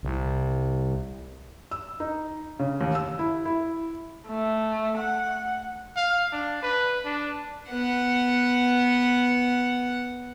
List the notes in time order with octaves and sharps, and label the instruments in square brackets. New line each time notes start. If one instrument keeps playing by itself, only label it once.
[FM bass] C2
[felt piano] E6
D#4
C#3
D#2
E6
E4
E4
[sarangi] A3
F#5
[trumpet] F5
D4
B4
D4
[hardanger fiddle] B3 F#5